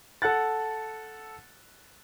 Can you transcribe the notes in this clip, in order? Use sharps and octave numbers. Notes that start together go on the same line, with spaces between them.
A4 F#5 F#6 A6